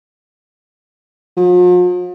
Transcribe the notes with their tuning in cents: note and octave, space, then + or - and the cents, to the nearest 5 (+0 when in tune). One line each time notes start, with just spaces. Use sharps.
F3 +45